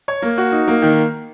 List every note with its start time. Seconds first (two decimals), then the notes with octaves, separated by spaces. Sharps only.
0.08 C#5
0.22 A#3
0.38 F#4
0.52 D#4
0.68 A#3
0.82 D#3